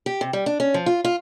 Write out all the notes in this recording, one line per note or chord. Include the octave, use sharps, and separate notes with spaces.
G4
C3
G3
D4
C#4
F3
F4
F4